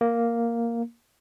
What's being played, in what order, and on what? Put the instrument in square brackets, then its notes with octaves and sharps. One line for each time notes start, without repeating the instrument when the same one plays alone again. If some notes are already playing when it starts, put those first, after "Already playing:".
[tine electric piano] A#3